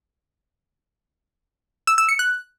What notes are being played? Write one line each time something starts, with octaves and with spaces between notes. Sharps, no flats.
E6
E6
C#7
F#6